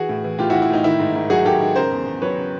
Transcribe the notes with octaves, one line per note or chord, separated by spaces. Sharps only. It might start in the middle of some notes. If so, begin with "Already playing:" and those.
Already playing: E3 F#4 G#4
A2
E3
A2 F4 G4
E3 E4 F#4
E4
A2 D#4
D#3 E4
G#2
G#2
F#3 F#4 G#4
D#3 G4 A4
G#2
C#3 A#4 C5
E2
E2
F#3 B4 C#5
C#3